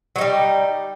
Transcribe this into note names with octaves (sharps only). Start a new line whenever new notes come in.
F#3 G3 D#4